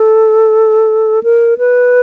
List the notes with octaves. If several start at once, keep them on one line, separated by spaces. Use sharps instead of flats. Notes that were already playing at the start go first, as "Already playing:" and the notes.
Already playing: A4
A#4
B4